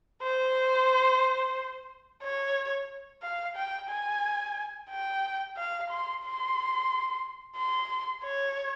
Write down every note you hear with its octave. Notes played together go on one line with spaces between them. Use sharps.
C5
C#5
F5
G5
G#5
G5
F5
C6
C6
C6
C#5